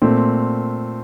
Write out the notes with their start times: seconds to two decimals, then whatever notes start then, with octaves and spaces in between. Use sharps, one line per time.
0.02 A#2 A3 C4